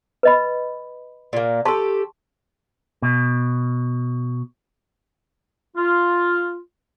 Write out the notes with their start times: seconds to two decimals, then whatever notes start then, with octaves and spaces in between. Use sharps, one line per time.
0.23 B4 D#5 B5
1.33 A#2 A#3
1.65 G4 A4 A5 C6 C#6
3.02 B2
5.77 F4